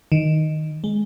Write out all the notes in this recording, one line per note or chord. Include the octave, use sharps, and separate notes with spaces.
D#3
G#3